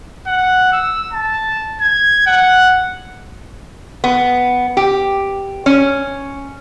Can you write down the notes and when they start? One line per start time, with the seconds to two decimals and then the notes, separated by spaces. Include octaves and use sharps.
0.27 F#5
0.73 E6
1.13 A5
1.81 G#6
2.27 F#5
4.04 B3
4.77 G4
5.66 C#4